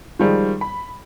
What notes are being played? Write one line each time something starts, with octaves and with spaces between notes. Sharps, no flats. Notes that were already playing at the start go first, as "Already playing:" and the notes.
D#3 F3 G3 G#3
B5